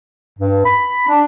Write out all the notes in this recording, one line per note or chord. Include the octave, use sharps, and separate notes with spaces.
G2
B5
D4